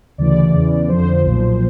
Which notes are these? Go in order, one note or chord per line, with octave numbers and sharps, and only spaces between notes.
D2 C#3 E3 D5
E2 C#3 E3
F2 D3 F3 C5
B1 A#2 F3